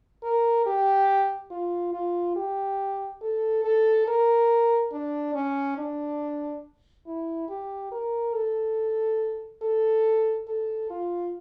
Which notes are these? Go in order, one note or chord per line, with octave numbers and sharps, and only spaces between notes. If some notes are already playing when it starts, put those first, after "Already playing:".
A#4
G4
F4
F4
G4
A4
A4
A#4
D4
C#4
D4
E4
G4
A#4
A4
A4
A4
F4